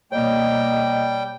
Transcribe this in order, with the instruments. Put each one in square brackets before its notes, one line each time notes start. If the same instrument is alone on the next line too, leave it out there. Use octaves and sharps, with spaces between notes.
[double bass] B2 A#3 [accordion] G3 G5 [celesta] C#5 [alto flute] D#5